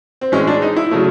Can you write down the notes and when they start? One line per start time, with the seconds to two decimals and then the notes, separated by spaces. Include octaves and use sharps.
0.21 C4
0.32 A2 E3 G#3 C#4
0.47 D4
0.62 D#4
0.76 E4
0.91 C#3 F#3 A3